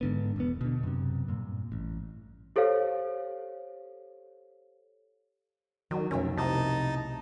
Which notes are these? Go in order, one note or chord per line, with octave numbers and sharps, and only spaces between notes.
G#2 D3 B3
E1 E2 B3
B2 D3
F#2 C3
G2 A#2
A1
G4 A4 C5 C#5 F5
D#3 F#3 C#4 D#4
C2 F2 B2 A3 C#4 A#4 E5
C3 D#4 E4 D#5 A5